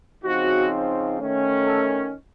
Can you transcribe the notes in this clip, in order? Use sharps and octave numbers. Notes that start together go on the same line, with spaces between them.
C#3 F3 C4 D#4 F#4
D#3 A3 C#4
A4